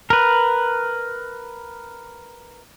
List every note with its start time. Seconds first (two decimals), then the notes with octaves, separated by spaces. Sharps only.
0.10 A#4 B4